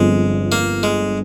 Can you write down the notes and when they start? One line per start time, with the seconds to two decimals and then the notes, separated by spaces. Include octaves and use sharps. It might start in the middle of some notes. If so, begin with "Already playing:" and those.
Already playing: G1 G2 D3 F3 G#3 C4
0.52 A#3
0.83 G#3